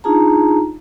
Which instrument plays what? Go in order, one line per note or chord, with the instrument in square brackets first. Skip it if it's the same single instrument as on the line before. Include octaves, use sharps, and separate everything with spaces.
[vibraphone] D4 D#4 F4 G#4 A5 A#5